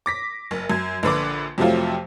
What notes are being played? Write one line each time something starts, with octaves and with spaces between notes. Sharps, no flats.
D6 A#6 B6
F#1
F#2 G#6
A#1 D3 B4 D6
F2 C3 F3 F#3 A3 F4